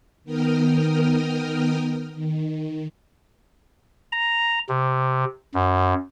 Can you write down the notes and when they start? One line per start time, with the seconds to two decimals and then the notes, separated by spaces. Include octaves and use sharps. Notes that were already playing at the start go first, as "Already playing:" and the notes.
0.24 D#3 B3 A#4 G5 D#6 F6
2.15 D#3
4.12 A#5
4.69 C3
5.54 F#2